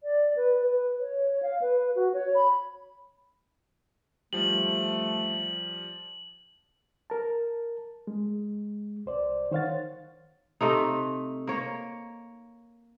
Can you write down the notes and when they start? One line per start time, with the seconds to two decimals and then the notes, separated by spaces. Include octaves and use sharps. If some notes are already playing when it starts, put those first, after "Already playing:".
0.03 D5
0.36 B4
0.62 B4
1.00 C#5
1.42 F5
1.61 B4
1.95 F#4
2.14 C#5
2.35 B5
4.33 F3 G3 A3 F#7
7.10 A#4 A5
8.07 G#3
9.06 C2 C5 D5
9.51 D#3 C5 C#5 F5 F#5 A6
10.61 C3 A3 D#4
11.47 A#3 C#5